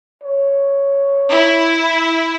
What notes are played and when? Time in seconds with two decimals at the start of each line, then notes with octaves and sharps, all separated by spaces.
0.24 C#5
1.30 E4